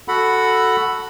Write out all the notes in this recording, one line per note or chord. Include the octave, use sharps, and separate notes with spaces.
F#4 A4 F#5 B5